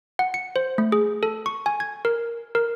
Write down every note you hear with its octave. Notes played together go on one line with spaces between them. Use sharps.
F#5
C#7
C5
A3
G#4
A4
C#6
G#5
G#6
A#4
A#4